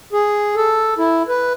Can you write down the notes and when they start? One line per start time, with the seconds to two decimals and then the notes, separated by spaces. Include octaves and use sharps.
0.13 G#4
0.56 A4
0.98 E4
1.28 B4